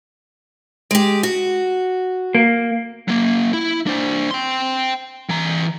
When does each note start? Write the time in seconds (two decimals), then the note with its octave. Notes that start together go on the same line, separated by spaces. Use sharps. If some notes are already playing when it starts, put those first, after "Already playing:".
0.91 G#3 G4
1.23 F#4
2.35 A#3
3.08 F#3 A#3
3.53 E4
3.87 D4 C5
4.31 G5 C6
5.29 E3 A#5